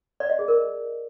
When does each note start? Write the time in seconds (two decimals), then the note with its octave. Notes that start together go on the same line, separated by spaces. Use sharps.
0.20 D5
0.30 D#5
0.39 G#4
0.48 A#4